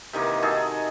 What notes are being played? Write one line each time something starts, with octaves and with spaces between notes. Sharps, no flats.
C3 D#3 E3 A#3
D#4 F#4 G#4 A4